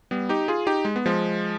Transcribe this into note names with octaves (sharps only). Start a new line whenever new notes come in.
G3 B3
D#4 G4
F4 G#4
D#4 G4
G#3
B3
F3 G#3